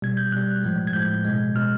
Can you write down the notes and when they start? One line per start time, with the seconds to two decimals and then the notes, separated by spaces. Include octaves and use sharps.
0.02 B2 G3 G#6
0.17 G6
0.32 B2 G3 F#6
0.63 A2 F3 G#3
0.87 G#6
0.93 A2 F3 G#3 G6
1.25 B2 G#3
1.55 B2 G#3 F6